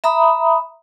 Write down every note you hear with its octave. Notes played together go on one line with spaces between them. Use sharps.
E5 A#5 B5 D#6